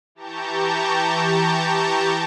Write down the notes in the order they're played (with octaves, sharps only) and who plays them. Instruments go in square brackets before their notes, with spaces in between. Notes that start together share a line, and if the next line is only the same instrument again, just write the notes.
[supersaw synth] E3 G4 A5 A#5 C#6 G6